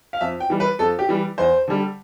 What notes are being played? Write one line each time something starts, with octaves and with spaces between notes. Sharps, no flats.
F5
F2 E5
G5
E3 G3
B4
F2 A4
G4
E3 G3
E2 C5
D3 G3